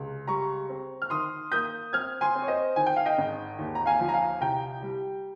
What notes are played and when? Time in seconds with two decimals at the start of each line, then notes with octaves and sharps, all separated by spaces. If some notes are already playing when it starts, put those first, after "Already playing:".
Already playing: C#2 C3
0.28 G3 A#5 C#6
0.69 C4
1.02 F6
1.10 D#3 C6 D#6
1.52 A#3 D#6 G6
1.93 C4 F6 G#6
2.21 G#5 C6
2.35 C4
2.42 C#5
2.48 C5 D#5
2.76 D#3 G#5
2.87 G5
2.96 F5
3.05 D#5 G5
3.18 G#1
3.59 D#2
3.75 A#5
3.86 F5 G#5
4.00 F3
4.09 A#5
4.14 F5 G#5
4.41 C2 G5 A#5
4.82 G3